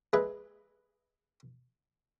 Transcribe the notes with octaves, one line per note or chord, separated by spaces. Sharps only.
G#3 G#4 B4 E5